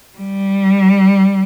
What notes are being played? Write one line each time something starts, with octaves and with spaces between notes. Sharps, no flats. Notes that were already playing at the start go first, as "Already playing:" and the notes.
G3